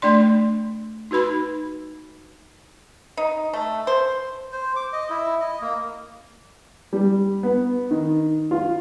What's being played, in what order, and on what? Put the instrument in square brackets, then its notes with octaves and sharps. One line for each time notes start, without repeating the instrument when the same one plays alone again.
[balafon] A3 D4 D5 C6
D#4 F#4 B4 B5
[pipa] D#4
A3
C5
[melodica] C5
D6
D#5
E4
D#5
A#3
[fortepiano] G3
B3
D#3
F4